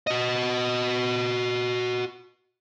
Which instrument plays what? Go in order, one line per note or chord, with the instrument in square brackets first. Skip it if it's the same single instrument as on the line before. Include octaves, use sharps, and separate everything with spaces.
[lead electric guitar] F#4 D#5